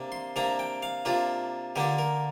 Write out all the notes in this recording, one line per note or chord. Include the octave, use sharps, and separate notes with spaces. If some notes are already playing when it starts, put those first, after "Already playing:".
Already playing: C3 A#3 D4
C6
C3 A#3 D4 A#5
G5
F5
C3 A#3 D4 F4
D3 A#3 D4 G4
A#4